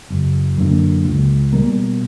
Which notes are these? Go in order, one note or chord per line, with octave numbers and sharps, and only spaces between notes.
F#1
F#2 D3 A#3
C#2
B2 G3 A#3